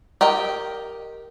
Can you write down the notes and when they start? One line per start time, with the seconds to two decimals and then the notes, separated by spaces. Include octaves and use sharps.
0.21 G4 A#4 D#5 G5